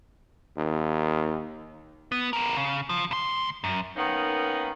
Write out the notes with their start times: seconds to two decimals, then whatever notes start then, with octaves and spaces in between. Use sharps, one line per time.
0.57 D#2
2.12 B3
2.33 B3 A#4
2.56 C#3
2.89 F3
3.11 D2 C6
3.64 F#2
3.96 D#3 A#3 B3 C#4 D#4